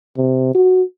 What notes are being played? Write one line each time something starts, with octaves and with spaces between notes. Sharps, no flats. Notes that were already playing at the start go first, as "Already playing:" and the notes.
C3
F#4